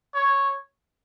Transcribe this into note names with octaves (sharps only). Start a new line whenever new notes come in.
C#5